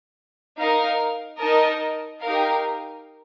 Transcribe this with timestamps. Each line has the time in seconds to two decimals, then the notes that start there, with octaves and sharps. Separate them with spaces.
0.59 D#4 A#4 F5
1.40 D#4 A#4 D#5 A5
2.22 D#4 G4 A#4 F5